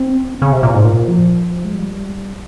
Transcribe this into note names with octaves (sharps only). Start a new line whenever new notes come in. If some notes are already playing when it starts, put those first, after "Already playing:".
Already playing: C4
C#3
C3
A#2
G#2
A#2
F3
G#3
G3